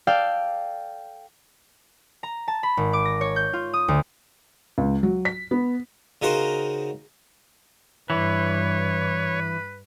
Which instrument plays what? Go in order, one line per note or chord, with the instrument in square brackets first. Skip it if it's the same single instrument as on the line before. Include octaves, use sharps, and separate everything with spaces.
[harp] A4 D5 F5 G5
A#5
A5
B5
G#1
D6
A#6
C#5
G6
F4
D#6
D2
[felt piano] C#2
F#3
B6
B3
[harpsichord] C#3 D#4 F#4 A#4 C5
[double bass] G2 [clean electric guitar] E3 [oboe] B4 [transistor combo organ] C#5